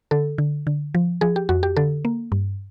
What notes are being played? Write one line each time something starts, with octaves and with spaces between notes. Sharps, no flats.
D3 A4
D3
D3
F3
F3 G#4
G4
F2 F#4
G4
D3 A4
A#3
G2